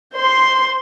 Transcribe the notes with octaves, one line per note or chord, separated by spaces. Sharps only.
C5 C6